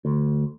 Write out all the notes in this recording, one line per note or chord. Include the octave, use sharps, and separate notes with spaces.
D2